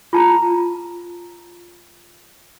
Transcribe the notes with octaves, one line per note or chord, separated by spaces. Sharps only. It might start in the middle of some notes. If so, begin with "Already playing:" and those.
F4 A5 A#5